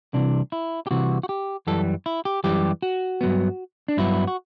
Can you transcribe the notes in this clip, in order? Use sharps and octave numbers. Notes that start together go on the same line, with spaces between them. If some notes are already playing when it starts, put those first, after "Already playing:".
C2 C3 E3 D4
E4
G4
C2 C3 E3 F#4
F#4
G4
F#2 E3 G3 A4
E4
G4
F#2 E3 G3 G4
F#4
G2 F#3 B3
D4
G2 F#3 B3 E4
F#4